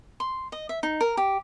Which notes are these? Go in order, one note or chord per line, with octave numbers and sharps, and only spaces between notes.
C6
D#5
E5
D#4
A#4
G4